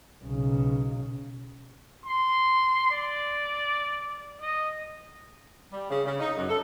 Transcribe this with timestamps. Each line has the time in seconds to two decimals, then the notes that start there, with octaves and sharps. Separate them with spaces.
0.24 B1 C#3
2.06 C6
2.91 D5
4.41 D#5
5.72 G3
5.90 C#3
6.06 C#3
6.20 D#4
6.36 F#2
6.49 A4